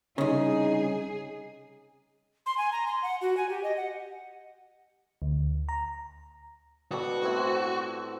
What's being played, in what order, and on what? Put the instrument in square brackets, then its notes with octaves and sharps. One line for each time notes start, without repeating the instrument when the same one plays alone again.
[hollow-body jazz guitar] C2 C#3 [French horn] D#4 [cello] G#4
[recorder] C6
G#5
A#5
C6
F#5
F#4
G#5
G4
D#5
F#5
[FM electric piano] D2
A#5
[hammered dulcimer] B2 G3 A4 [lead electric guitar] F#4
[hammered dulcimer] A2 C4 E4